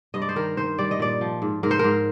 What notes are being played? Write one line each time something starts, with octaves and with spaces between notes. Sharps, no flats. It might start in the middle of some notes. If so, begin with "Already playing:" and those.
G2 D#5
D5
C5
D#3 A#4
D#3 C5
G3 D5
D#5
A#2 D5
F3
G#2
G#2 A#4
C5
A#4
G#2